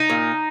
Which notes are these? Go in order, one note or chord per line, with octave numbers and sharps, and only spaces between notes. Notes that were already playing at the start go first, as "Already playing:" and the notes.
Already playing: D#4
A#2